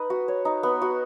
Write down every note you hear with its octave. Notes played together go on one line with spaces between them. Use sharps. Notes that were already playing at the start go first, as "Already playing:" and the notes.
Already playing: D#4 B4 D#5
F#4
C#5
D#4
B3
F#4